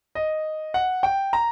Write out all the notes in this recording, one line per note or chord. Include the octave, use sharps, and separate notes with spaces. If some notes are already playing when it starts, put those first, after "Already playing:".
D#5
F#5
G5
A#5